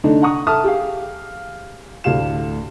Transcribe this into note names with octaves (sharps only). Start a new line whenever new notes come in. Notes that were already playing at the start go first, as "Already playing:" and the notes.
D3 A3 D4 D#4
F#5 A#5 C#6 D#6
A4 E5 A5 D#6 F6
G4 G#4 F5
D2 A2 G4 F5 E7